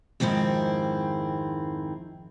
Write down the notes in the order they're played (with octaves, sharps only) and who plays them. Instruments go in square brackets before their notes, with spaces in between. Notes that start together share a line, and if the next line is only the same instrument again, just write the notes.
[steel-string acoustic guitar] F2 G#2 D#3 C4 E4